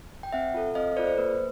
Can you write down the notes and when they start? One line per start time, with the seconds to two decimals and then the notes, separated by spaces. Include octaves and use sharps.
0.23 G5
0.32 C4 E5 F#5
0.54 F4 A4
0.75 C4 D#5 F5
0.96 F4 A4 C5 D5
1.07 C5
1.18 A#3 B4